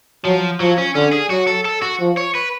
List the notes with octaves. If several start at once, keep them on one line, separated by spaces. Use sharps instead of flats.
F3 F#3
F3 F#3
C#4
D3 C#4
G#4
F#3 F#4
A4
A4
F#4
F3
C#5
B4